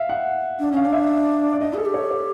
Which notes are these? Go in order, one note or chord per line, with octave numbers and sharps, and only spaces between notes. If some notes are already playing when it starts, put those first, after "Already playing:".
Already playing: E5 F5
F#5
D4
C#4 F5
D4
E5
D5
D4 D#5
G#4 A4
G4
C#5
C#5